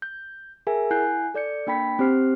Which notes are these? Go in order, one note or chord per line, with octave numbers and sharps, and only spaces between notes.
G6
G#4 A#4 E5 G#5
E4 F#5 G#5 F#6 G6 C7
A4 D5 G6 C#7
A#3 D4 G5 B5 B6
C4 G4 C5 F6 C7